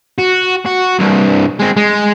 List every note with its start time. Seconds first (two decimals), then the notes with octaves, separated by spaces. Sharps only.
0.18 F#4
0.66 F#4
0.99 C2 G2
1.60 G#3 C4
1.77 G#3